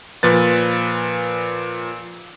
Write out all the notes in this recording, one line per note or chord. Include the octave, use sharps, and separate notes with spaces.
A#2 F3 B4 A6